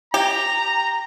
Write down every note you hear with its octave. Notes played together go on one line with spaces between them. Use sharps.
G4 A#5